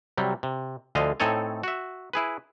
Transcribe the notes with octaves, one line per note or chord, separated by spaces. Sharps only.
C3 F#3 G3
C3
D2 D3 F3 D#5 F5
A2 C4 D#4 A4 C#5 G#5
F#4 E5
E4 G#4 B4